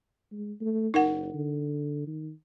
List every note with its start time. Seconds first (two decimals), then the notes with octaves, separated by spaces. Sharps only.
0.32 G#3
0.61 A3
0.94 F#1 D#4 A#4 F#5
1.34 D3
2.07 D#3